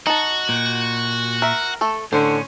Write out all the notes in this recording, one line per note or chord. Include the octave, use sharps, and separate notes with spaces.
D#4 F#4 A5
A#2
A#4 E5
A3 A4
A2 D3 C#4 C5